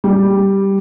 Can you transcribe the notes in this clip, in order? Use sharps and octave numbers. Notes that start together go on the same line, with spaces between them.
G3